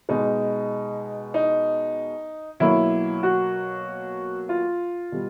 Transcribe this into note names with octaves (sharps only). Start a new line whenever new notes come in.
B2 G#3 D#4
D#4
B2 F#3 A#3 E4
F#4
F4
B2 G3